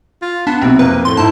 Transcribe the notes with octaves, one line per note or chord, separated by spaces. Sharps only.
F4
B3 D4 B6
B1 C3 C4
F2 A#3 B4
A2 C6
G#2 E4 A5